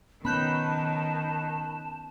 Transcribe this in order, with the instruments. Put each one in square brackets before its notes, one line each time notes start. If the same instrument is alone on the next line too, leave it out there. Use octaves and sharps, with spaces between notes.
[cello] D#3 [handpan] B3 C#4 [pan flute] A5 [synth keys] B5 F#6 G6